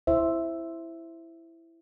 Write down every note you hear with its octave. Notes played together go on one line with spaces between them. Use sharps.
E4 C5 E5